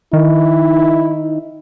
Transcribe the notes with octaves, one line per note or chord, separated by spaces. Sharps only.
D#3 E4